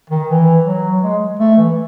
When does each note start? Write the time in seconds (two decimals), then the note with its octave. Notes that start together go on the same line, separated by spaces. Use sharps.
0.10 D#3
0.29 E3
0.65 F#3
1.03 G#3
1.39 A3
1.57 E3